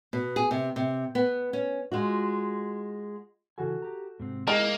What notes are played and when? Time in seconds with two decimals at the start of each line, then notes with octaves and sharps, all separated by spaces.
0.13 B2
0.36 G#4
0.51 C3
0.76 C3
1.15 B3
1.53 C#4
1.92 G#3 F4 F#4
3.58 C#3 E3 F#4 A4 G#5
3.82 G4 A#5
4.20 G#2 C3 C4
4.48 G#3 A#3 D#4 E4 G#5